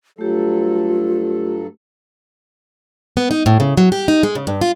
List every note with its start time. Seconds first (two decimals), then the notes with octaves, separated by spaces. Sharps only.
0.18 G2 F#3 A3 F4 G4 A4
3.17 B3
3.31 D#4
3.46 A2
3.60 C#3
3.77 F#3
3.92 G4
4.08 D#4
4.23 G#3
4.35 C#3
4.47 G2
4.61 F4